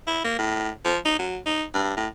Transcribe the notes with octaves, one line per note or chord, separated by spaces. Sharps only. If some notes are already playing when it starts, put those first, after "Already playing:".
E4
A#3
A2
F3
D#4
F#3
D#4
G2
A2